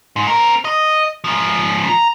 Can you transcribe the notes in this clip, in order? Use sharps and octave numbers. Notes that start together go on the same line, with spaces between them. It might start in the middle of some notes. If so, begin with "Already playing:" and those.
G#2
C4 A#4
D#5
G#2 F3
A#5